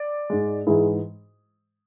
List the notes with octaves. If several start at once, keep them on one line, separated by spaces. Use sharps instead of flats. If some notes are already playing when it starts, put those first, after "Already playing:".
Already playing: D5
G#2 G#3
G#2 E3 G#3 E4 G#4